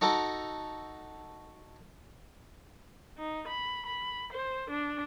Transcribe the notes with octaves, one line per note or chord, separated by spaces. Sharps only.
D#4 F#4 A4 A#5 D6
D#4
B5
B5
C5
D4